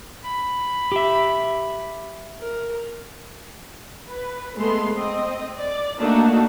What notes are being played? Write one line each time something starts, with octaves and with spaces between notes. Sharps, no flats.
B5
G4 E5
A#4
B4
G#3 A3 B3 C6
C4 D#5
D5
A3 A#3 D4 D#4 F#4